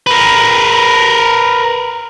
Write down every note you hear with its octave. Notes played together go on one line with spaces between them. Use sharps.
A#4 B4